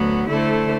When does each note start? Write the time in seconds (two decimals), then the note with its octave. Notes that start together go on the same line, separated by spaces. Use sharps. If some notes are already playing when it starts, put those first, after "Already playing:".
Already playing: D2 F#3 B3
0.28 D3 A3 E4 A4 C5